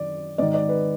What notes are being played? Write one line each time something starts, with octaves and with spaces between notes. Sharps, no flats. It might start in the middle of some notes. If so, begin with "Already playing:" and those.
Already playing: F#2 D#3 D5
G#2 D#3 D5
D5
B4